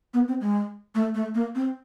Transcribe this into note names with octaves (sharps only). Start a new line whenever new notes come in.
B3
C4
G#3
A3
A3
A#3
C4